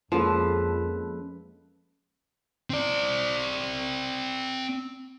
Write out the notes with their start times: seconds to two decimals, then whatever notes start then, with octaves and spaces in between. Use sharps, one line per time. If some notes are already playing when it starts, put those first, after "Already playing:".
0.12 F2 F3 G#3 A#3 C#4 F4 A4 B4
2.70 C4 D5